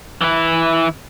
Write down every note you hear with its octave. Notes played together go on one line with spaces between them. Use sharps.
E3 E4